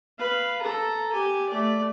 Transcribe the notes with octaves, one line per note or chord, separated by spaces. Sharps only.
B4 F5
A4 A#5
G4 G#5
A3 D5